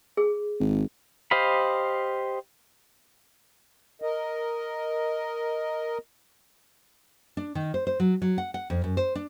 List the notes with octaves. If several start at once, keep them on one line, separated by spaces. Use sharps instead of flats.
G#4
G#1
G4 C5 D#5 F5 B5
A#4 D#5
D4
D#3
C5
C5
F#3
F#3
F#5
F#5
F2
F#2
C5
D4